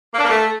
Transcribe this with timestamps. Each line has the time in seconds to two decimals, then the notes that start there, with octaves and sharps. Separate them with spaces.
0.13 A#3
0.19 D4
0.24 A#3
0.29 A3